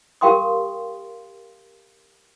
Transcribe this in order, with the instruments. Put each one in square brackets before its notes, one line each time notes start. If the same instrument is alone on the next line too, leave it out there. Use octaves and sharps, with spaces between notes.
[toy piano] G4 A#4 F5 G5 C6 D#6